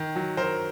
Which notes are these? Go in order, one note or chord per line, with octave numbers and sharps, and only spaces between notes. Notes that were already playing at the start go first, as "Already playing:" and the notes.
Already playing: D#3
F#3
F#3 A#4 C5